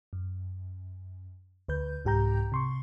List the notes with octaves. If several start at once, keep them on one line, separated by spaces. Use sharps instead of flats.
F#2
D2 B4 G6
C2 G#2 G4 G5 A#5 G6
C3 C6 C#6